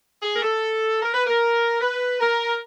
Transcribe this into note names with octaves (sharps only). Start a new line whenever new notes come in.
G#4
A#4
A4
A#4
B4
A#4
B4
A#4